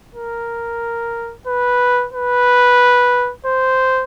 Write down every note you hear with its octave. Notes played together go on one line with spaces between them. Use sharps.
A#4
B4
B4
C5